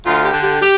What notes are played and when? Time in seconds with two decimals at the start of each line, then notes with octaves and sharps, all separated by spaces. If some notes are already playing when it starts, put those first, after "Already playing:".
0.06 D2 F4
0.24 G4
0.33 D3
0.43 G4
0.61 G4